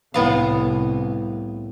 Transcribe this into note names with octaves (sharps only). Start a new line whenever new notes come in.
C2 A2 B3 F5